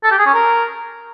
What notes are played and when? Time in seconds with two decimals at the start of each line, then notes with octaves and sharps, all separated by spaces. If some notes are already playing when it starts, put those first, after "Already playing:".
0.04 A4
0.11 G4
0.19 G#4
0.26 C#4
0.34 A#4